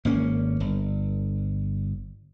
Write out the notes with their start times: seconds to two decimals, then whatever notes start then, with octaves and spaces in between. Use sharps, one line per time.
0.05 G#1 A#3 C#4
0.60 G1